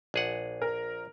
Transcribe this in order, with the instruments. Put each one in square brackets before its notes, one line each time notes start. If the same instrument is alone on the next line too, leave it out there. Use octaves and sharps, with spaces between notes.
[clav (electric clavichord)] A#1 G#4 F#5
[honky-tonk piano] A#4